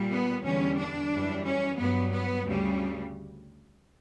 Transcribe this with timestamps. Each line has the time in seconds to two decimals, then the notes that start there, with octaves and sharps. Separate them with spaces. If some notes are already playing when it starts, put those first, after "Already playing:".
Already playing: A#2 G3
0.10 B3
0.44 E2 D3 G3 C#4
0.78 D4
1.11 F#2 E3 G3
1.45 C#4
1.78 G2 F#3 B3
2.13 B3
2.46 D2 C#3 G3